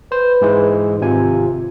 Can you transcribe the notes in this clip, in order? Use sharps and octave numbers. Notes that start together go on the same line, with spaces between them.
B4 C5
G#2 E3 G#3
G#1 C3 F4 G#5